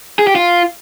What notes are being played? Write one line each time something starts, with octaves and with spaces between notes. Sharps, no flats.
G#4
G4
F4